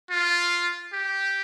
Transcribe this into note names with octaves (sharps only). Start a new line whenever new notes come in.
F4
G4